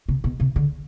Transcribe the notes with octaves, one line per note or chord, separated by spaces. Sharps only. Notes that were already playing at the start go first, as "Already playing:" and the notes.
C3
B2
C3
D3